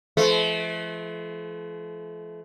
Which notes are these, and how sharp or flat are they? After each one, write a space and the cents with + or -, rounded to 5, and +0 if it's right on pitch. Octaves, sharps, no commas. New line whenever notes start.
F3 -40 A3 -40